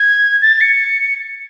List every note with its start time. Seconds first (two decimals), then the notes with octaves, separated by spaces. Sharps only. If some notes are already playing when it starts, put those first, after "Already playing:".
Already playing: G#6
0.42 A6
0.61 C#7